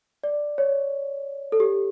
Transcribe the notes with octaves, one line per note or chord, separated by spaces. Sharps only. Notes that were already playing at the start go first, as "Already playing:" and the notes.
D5
C#5
A4
G4